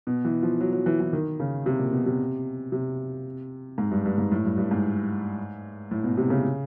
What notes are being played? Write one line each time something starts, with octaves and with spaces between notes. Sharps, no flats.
B2
E3
F3
F#3
F#3
E3
E3
D#3
C#3
C3
A#2
B2
C3
C3
G#2
G2
G2
G#2
A2
G2
G2
G#2
A2
B2
C3
C#3